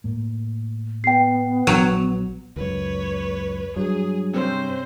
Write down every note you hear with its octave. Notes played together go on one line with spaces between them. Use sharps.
A2 A#3
B3 G5 C7
A#1 F#3
C#2 F#2 B4 C#5
G2 F#3 G#4
C3 C4 C#4 C5